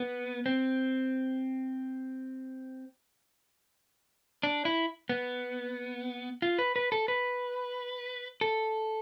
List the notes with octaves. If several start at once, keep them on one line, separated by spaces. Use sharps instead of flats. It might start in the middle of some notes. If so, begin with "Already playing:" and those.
Already playing: B3
C4
D4
E4
B3
F4
B4
B4
A4
B4
A4